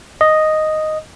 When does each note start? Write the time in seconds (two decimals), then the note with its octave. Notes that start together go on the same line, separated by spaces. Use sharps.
0.21 D#5